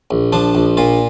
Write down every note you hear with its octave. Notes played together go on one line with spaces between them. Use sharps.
A#1
F3 D4
A#1
A#2 F4